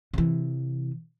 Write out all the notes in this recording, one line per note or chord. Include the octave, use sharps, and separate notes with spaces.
C3 E3